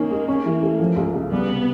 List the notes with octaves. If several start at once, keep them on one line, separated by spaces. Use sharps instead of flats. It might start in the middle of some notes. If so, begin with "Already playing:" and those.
Already playing: D#3 A#3 C#4
G#3
C#4
E3
A3
F3
C#2
C#3
G3 B3
C3